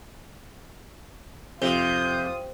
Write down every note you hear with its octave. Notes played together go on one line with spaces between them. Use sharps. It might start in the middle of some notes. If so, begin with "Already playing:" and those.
F2 C3 F4 D#6 G6